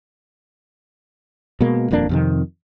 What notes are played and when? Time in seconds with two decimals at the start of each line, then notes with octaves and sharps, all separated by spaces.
1.61 B2 G#3 A#3
1.91 D#1 F2 A#3 D4
2.09 F2 C3 D#3